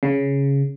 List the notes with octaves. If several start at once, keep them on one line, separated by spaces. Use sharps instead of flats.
C#3